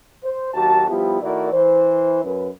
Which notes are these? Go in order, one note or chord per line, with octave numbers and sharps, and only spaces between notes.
C5
D#2 F#3 F#4 G4 A5
F3 G3 B3 E4 F4 G4
D#3 A3 E4 F#4 A#4 D5
E3 C5
F#2 B4